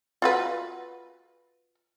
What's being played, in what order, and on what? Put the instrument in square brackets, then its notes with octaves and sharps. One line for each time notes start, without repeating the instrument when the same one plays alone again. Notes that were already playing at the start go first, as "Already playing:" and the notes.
[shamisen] F4 F#4 B4